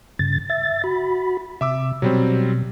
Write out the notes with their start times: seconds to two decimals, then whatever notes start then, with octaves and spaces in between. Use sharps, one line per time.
0.19 G2 C#3 A6
0.50 E5 A6
0.84 F#4 B5
1.61 C3 E5 D6 E6
2.02 B2 F#3 G3 C4